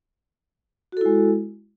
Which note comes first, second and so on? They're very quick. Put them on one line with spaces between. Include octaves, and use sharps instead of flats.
F#4 A4 E4 G#3